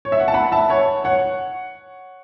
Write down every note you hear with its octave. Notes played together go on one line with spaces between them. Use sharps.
C#5
E5
F#5
A5
F#5 B5
E5 A5
C#5 F#5
C#5 F#5